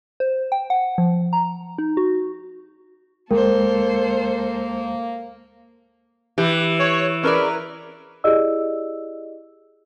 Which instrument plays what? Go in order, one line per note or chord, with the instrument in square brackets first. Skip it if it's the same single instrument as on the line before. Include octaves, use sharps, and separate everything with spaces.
[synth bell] C5
G5
F#5
F3
A#5
D#4
F#4
[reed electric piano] D2 G#3 G5 [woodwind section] A#3 [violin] A4 C5 [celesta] A#4
[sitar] E3 [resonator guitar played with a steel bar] G4 B4
[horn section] C#5
[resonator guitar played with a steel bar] C#4 G#4 D5 [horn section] A#4 B4
[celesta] E4 G4 G#4 D5 D#5 E6